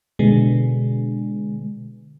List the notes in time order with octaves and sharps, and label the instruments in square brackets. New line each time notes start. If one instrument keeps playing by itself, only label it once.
[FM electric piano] B2 D3 G#3